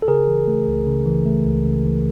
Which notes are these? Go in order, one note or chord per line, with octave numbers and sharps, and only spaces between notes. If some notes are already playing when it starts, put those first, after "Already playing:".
A4
C#3 G#4 A#4
E3
A3
C#2
C#3
E3
A3
C#2
C#3
E3